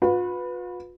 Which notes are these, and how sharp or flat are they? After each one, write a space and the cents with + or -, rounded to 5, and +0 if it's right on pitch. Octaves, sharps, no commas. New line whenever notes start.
F4 +45 B4 +0